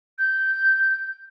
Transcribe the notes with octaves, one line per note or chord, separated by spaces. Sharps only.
G6